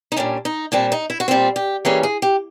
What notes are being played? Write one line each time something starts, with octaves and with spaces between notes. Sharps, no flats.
D#4
A#2 G3 A#3 C#4 D4
D#4
A#2 G3 C4 D4
D#4
E4
F#4
A#2 G3 C4 F4
G4
E3 G3 A#3 C#4 G#4
G#4
G4